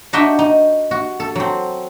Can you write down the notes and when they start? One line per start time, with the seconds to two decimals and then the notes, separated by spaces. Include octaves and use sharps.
0.13 D4 D#4 F#4 D#5 E5 G5
0.39 D#4
0.91 F#4
1.20 A4
1.35 F#3 C4